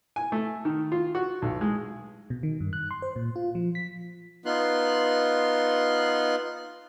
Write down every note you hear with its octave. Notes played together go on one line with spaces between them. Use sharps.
G#5
A3
D#3
F4
F#4
B1
G#3
B2
D#3
G2
F#6
C6
C5
A#2
F4
F3
B6
B3 D#4 F4 C6 F#6